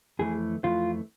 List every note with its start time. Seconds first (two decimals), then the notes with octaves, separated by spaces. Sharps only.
0.19 F2 E3 A3 G#4
0.63 F2 E3 A3 F4